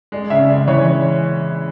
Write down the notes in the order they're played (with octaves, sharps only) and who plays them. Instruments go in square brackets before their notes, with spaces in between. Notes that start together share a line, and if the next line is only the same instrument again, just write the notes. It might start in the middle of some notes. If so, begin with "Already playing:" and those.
[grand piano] G#3 [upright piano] D5
[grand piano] C#3 [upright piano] E5
[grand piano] G#3 [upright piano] D5
[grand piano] E3 [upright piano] C#5